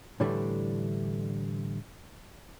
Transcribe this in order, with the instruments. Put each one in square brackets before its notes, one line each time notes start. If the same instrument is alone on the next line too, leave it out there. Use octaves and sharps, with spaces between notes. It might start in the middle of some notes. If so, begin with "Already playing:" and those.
[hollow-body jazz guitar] A2 D3 E3 G3 A3 D4